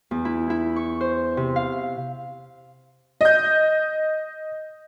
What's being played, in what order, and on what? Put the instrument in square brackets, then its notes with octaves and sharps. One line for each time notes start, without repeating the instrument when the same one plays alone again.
[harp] E2
E4
E4
C#6
C5
C3
F5
[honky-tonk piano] D#5 G6